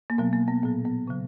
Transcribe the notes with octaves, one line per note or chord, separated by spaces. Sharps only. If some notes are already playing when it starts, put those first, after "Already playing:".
A#3
B2 F#3 B3
A#3
B3
A#2 F#3 B3
B3
C#3 F#3